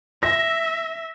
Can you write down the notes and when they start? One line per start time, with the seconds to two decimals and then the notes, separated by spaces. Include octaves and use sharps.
0.23 E5 A#6